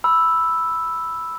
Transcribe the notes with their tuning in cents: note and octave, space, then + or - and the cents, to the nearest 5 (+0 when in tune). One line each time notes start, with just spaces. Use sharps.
B5 +0 E6 +0